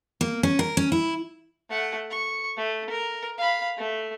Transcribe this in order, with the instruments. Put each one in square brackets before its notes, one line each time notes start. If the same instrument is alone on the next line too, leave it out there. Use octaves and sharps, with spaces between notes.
[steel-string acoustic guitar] A#3
C#4
A#4
C#4
E4
[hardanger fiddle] A3 F#5
C#6
A3
A#4
F5 B5
A3